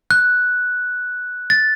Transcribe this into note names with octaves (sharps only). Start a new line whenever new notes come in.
F#6
A6